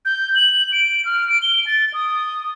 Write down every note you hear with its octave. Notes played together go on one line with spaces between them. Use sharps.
G6
F#7
D7
F6
D7
G7
A6
D#6